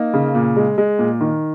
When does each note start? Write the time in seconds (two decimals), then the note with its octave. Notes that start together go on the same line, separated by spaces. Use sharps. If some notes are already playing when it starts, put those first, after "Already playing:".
Already playing: A#3 D#4
0.13 C#3
0.35 A#2
0.56 G#3
0.78 G#3
0.99 A#2
1.20 D#3